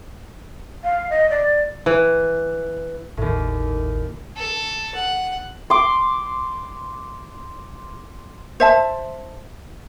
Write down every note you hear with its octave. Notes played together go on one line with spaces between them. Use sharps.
F5
D#5
D5
E3
G#1 D#2 A2
A4
F#5
C6 D6
C5 E5 A5